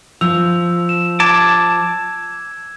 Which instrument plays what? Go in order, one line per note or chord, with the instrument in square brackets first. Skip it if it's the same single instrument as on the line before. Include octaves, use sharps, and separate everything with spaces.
[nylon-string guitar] F3 [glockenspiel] E6 F7
[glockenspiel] E7
[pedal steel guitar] A5 D6 [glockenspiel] G#6